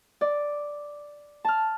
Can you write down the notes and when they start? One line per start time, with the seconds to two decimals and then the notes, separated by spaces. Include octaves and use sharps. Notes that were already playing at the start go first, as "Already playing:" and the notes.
0.21 D5
1.45 A5 F6